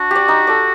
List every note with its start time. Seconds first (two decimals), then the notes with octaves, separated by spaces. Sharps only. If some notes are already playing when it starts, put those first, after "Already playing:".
Already playing: D4 F#4
0.11 G4 D5
0.28 D#4
0.47 A4 D5